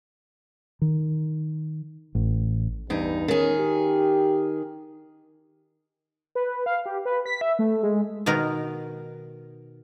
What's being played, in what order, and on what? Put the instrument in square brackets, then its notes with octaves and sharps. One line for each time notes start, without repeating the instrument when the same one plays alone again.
[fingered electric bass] D#3
A1
[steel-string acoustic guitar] E2 D#4 [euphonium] G2
[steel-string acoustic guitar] D#3 G#4 [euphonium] C#4
[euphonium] G4
[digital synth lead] B4
F5
G4
B4
B6
E5
A3
G#3
[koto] B2 D#3 B3 A#4